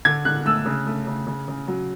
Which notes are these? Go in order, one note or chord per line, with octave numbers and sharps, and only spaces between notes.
D3 G#6
D3 F#6
A3 E6
C#3
A3
C#3
C#3
C#3
F#3